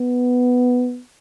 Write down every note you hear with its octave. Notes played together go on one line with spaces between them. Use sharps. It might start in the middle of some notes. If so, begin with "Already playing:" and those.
Already playing: B3